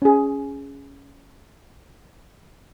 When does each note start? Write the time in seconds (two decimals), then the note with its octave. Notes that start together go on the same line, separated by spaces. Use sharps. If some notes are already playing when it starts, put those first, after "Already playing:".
0.02 C#4 G#4